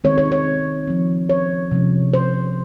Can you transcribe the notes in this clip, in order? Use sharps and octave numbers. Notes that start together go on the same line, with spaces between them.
D#3 G#3 C4 C#5
C#5
C#5
F3 C4
C#5
C3 F3 G#3 C#4
C5